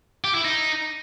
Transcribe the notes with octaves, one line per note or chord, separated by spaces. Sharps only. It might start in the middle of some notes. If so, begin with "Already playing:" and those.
G4
E4
D#4